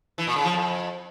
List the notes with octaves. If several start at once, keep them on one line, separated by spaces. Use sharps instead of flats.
E3
A#2
C#3
F3
F2